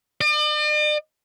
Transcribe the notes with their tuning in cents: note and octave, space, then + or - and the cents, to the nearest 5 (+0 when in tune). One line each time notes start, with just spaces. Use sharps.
D5 +45